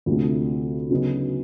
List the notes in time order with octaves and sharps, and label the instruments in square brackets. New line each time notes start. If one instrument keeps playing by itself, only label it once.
[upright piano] D2 C3 F3 A3
C#3 F#3 B3 D#4